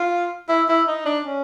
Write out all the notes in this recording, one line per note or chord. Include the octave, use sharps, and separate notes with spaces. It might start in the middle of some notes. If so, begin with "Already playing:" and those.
Already playing: F4
E4
E4
D#4
D4
C#4